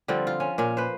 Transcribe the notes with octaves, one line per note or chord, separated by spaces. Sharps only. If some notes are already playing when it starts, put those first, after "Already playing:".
D3 F3 G3 C4
F4
C#4
A#2 C#4
B4 C5